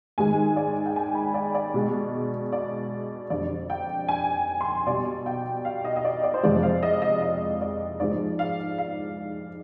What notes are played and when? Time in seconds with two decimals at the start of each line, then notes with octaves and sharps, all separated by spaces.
0.18 G#2 D#3 G#3 G#5
0.56 D5
0.86 G5
0.96 G#5
1.15 B5
1.34 D5
1.55 D5
1.74 B2 G#3
2.52 D5
3.30 F2 D3 G3 D5
3.70 G5
4.08 G#5
4.61 C6
4.87 B2 G3 D5
5.26 G5
5.65 F5
5.85 D#5
5.96 D#5
6.05 D5
6.23 D5
6.34 C5
6.43 F2 C3 F3 G#3 D5
6.63 F5
6.83 D#5
7.02 D#5
7.22 D#5
7.61 D5
8.00 G#2 F3 G#3 D5
8.39 F5
8.78 F5